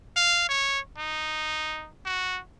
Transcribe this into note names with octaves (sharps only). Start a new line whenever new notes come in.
F5
C#5
D#4
F#4